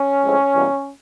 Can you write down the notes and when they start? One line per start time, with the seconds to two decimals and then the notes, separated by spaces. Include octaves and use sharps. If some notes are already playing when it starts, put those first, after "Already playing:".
Already playing: C#4
0.24 A2 F3 G#3 C4
0.54 E2 B2 G3 A#3